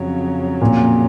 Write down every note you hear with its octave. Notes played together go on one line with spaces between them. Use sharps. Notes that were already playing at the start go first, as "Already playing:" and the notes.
Already playing: F2 C#3 F#3
A#2